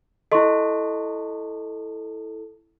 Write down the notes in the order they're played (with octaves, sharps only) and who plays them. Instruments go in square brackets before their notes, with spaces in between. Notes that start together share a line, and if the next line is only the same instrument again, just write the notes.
[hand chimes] E4 A4 [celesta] D#5 C6 C#6